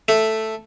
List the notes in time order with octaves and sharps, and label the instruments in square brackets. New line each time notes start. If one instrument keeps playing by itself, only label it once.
[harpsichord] A3